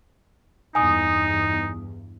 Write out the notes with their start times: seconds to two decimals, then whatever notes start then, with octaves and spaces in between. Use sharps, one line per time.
0.75 E2 G2 D#4 G#5 D#6